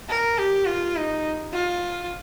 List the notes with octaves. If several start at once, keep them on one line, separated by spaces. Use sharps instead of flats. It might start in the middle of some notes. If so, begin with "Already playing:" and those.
A#4
G4
F4
D#4
F4